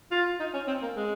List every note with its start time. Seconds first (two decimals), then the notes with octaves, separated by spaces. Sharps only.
0.11 F4
0.40 D#4
0.54 C#4
0.68 C4
0.82 A#3
0.96 G#3